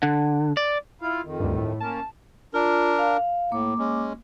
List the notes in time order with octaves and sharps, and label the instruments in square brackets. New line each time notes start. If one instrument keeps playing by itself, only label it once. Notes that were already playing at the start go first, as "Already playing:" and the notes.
[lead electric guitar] D3
D5
[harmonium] E4 F4 F5
F2 D#3
[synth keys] D2 G2
A2
[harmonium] A#3 C#4 A#4 [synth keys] A5
[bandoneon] D4 A#4 [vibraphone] F4
[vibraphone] F5
[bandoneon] A2 [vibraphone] A#3 D6
[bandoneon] G#3 C#4